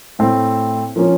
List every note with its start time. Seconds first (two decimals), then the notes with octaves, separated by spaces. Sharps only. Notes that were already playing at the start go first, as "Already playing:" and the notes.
0.19 A2 A3 C4
0.96 F3 A#3 C#4